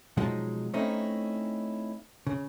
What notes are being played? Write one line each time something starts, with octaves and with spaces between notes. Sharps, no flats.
B2 F3 F#3 G#3 D#4
A3 C4 C#4 D#4 E4
C#3